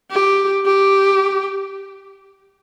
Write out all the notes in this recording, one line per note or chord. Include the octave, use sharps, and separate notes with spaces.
G4
G4